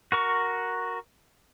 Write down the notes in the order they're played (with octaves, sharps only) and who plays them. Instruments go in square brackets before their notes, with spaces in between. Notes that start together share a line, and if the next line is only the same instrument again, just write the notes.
[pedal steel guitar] F#4 A#4 C#6